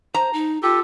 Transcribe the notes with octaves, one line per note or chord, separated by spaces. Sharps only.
C5 A#5
D#4
F4 G4 A4